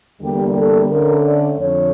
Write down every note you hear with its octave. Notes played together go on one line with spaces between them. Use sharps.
E2 D3 G3 A#3 G4
A4
D3 A3 C#4 A#4
D5
F2 D3 F3 A3 C#5